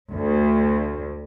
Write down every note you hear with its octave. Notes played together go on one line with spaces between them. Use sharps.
D2